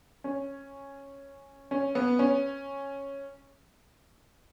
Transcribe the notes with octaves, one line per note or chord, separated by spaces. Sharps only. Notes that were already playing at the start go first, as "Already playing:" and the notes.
C#4
C#4
B3
C#4